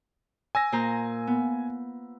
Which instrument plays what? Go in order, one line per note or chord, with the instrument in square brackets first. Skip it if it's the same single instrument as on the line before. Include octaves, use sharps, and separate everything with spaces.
[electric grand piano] G#5 E6 A#6
[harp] A#2 C5 A#5
B3